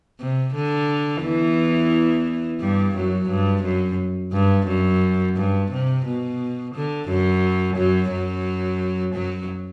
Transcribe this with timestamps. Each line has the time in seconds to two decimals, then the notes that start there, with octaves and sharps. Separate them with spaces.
0.20 C3
0.55 D3
1.23 E2 E3
2.60 G2 G3
2.95 F#2 F#3
3.29 G2
3.64 F#2
4.33 G2
4.67 F#2
5.37 G2
5.71 C3
6.06 B2
6.74 D3
7.08 F#2 F#3
7.76 F#2 F#3
8.11 F#2 F#3
9.15 F#2 F#3